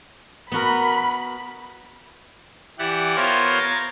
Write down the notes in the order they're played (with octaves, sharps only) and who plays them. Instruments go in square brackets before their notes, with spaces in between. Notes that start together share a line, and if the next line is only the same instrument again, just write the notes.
[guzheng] B3 F#4 A#4 [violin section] B5
[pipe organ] E3 E4 G4 D5 F#5
B3 F4 A#4 C5 C#5
A#5 G#6 A6